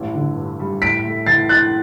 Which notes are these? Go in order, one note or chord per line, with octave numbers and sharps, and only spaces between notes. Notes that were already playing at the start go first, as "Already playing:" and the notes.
Already playing: A1 G2 G3
D3
G2
G3
A2 B6 D7
A3
E3 A6 C7
E4 F#6 A6